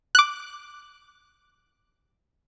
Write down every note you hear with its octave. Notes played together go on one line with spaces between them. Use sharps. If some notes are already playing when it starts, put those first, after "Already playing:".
D6 F#6